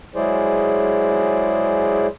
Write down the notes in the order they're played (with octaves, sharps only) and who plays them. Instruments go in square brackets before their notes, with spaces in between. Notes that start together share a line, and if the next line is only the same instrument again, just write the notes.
[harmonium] F#3 G#3 E4 G#4 C5 D5